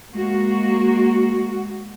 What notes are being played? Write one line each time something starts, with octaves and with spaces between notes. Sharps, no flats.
G#3 A#3 F#4